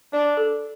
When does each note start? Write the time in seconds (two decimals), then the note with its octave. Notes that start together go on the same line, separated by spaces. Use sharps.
0.13 D4 D5
0.37 A4